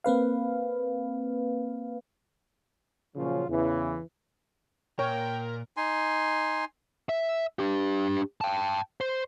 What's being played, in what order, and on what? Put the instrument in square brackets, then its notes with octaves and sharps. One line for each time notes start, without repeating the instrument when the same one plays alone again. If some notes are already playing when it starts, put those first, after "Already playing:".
[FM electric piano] A#3 C4 B4 F5
[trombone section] A#2 C#3 F3 F#3 C#4 F4
E2 C#3 E3
[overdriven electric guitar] A#2 [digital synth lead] A#4 [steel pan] C#5 [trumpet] G5
[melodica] D#4 G#5 C6
[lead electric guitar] E5
D4 G4
G5 A5
C5